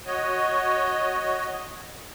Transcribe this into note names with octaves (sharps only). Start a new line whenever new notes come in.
F#4 C#5 D#5